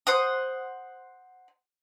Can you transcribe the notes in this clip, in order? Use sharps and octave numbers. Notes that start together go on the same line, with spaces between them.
C5 F#5 D#6